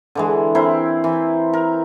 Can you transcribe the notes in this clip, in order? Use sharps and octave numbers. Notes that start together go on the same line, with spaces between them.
D3 E3 G#3
C4 E4 A#4 C5
E3
A#4